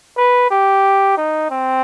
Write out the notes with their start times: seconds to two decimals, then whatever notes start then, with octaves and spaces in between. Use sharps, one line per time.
0.18 B4
0.50 G4
1.17 D#4
1.50 C4